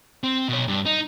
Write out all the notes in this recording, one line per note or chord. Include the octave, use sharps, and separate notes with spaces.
C4
B2 C#5
G2
D#4